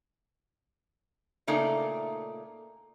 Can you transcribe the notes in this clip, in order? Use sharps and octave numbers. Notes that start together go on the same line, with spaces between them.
A#2 C#3 A3 A#3 D#4 D5